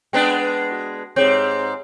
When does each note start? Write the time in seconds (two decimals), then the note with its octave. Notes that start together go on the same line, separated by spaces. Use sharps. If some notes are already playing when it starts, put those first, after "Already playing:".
0.13 G#3 B3 D4 G5
0.72 F#4
1.16 G#2 C4 G4 G#4 C#5